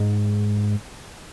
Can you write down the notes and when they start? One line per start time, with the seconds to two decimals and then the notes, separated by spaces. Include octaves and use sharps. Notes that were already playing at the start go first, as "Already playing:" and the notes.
Already playing: G#2